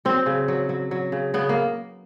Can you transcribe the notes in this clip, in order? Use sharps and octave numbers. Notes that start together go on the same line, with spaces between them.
F#3 C4
C#3
F#3
F#3
F#3
C#3
C#3 B3
A#3